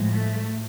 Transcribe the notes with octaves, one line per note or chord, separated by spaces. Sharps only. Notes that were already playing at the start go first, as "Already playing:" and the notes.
Already playing: A2 F3 G#3
A3